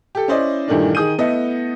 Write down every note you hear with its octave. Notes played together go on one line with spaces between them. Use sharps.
G4 A4
C#4 E4 C5 D5 D#5
G2 A#2 D#3 E3 A3 D4
D#3 G#4 D#6 G6 D#7
A3 B3 E4 A4 D#5